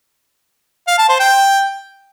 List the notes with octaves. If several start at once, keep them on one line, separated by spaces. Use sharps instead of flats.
F5
A5
C5
G5